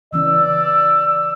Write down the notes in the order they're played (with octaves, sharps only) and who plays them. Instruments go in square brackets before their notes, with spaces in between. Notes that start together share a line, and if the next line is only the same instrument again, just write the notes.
[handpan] C#3 E3 C#4 [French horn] D5 [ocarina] E6